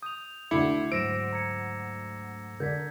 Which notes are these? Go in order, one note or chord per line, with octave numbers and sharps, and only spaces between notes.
D#6 G6 F7
D2 D3 D4 E4 D6 C7 C#7
G#2 F#3 C5 E6 A#6 D7 E7
A#5 G#6 C#7
D3 D4 A#4 G6 G#6 B6